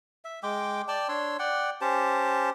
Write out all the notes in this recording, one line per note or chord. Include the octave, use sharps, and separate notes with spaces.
E5
G#3 G5 D6
D5 G5 A5
D4 C#5 C6 E6
D5 F#5 G5
C#4 G4 C5 A5